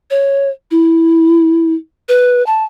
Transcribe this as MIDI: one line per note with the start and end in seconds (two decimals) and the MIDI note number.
0.11 0.49 73
0.71 1.74 64
2.09 2.45 71
2.46 2.64 81